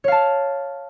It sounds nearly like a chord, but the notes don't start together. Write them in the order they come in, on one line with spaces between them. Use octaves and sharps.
C#5 F5 A5